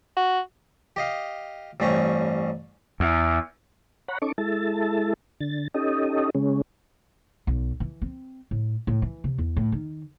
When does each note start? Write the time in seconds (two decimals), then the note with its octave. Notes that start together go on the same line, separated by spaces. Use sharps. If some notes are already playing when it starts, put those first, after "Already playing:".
0.17 F#4
0.96 G4 D#5 F5
1.80 A1 G2 C4 C#4 A#5 C#6
3.00 E2
4.08 C#5 F#5 A#5 B5
4.22 C#4 D#4 A4 C#6 D6
4.38 G#3 E4 A4 A5
5.40 D3 A6
5.74 C#4 D#4 G4 A4 D#5
6.35 C#3 G#3 C#4
7.47 B1
7.80 E3
8.02 C4
8.51 A2
8.87 A2
9.02 E3
9.24 C3
9.38 E2
9.57 A2
9.72 D#3